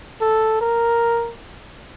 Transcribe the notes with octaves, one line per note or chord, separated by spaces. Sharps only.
A4
A#4